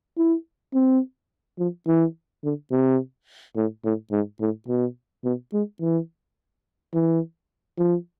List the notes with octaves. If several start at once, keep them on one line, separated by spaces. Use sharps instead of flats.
E4
C4
F3
E3
D3
C3
A2
A2
G#2
A2
B2
B2
G#3
E3
E3
F3